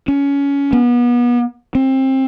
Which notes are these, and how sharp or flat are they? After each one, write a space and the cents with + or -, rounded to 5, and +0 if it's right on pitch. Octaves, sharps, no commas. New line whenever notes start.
C#4 +20
B3 -30
C4 +25